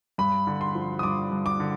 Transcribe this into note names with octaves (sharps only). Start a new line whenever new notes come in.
G2 B5
D3
C6
F3
D#6
G2 D6
G2
D6
D3